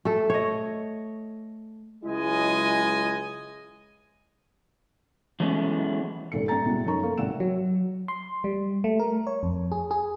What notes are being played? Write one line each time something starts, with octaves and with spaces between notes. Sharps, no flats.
A3 A4
C#5 D#5
C#2 F#3 G#3 E4 D#5 G#5
E3 F#3 G#3 A3 B3 C#4
D#1 G#1 C3 A4 C#7
G2 A3 A4 G5 A#5 A6
B2 G#3 E4 F#4
F#2 A3 D#4 A#4 A#5 C#6
A#3 A4 F5
G#1 C3 F#5 E6 E7
F#3
C6
G3
A3
A#4
C#5
F2
G#4
G#4